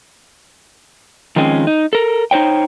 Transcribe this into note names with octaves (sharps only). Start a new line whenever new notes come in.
D#3 F3 G#3 C4 C#4
D#4
A4 A#4
D#4 C5 C#5 G5